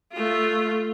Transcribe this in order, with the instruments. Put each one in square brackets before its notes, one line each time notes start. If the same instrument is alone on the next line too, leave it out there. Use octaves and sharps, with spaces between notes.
[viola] A3 F4